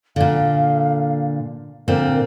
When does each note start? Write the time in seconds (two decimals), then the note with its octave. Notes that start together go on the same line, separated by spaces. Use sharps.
0.16 A#2 D3 F5
1.88 A#2 D3 C4 A#4